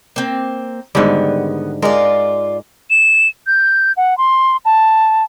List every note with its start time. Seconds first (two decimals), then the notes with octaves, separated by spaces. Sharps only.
0.16 A#3 C4
0.95 G#2 D3 D#3 G3 B3
1.82 G#3 F4 A#4 D5
2.90 E7
3.47 G6
3.97 F#5
4.18 C6
4.65 A5